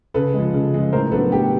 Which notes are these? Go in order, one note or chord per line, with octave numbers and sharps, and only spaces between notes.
C#3 A4 B4
F3 G#3
C#3
F3 G#3
A2 A#4 C5
F#3 B3 D4 A4 B4
A2 G4